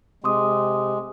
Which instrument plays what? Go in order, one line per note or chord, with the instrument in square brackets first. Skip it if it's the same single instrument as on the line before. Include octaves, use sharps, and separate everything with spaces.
[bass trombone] C3 [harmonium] G#3 [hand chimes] C6 D6 D#6